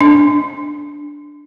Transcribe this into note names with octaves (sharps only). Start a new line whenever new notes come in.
D4